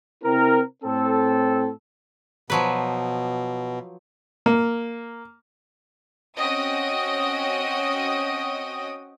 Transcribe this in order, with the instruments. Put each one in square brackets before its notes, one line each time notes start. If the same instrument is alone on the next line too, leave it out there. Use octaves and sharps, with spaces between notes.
[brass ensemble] C3 C4 E4 A#4
A2 C4 A4
[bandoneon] B2 [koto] F3 F#3 B4
[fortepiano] A#3
[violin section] C4 C#4 F#4 D#5 G5 D#6